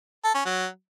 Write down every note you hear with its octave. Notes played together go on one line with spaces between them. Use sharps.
A4
C#4
F#3